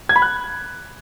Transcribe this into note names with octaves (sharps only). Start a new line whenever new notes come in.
G#6
B5
F#6